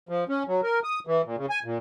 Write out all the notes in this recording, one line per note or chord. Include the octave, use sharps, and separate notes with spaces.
F3
C#4
F#3
A#4
D#6
E3
A#2
C#3
G#5
A#2